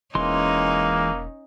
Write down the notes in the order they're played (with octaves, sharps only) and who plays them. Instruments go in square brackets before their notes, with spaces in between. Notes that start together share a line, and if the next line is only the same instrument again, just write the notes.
[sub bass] E1 [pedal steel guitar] E3 G#3 C6 [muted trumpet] A#3 [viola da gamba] C#4 D#4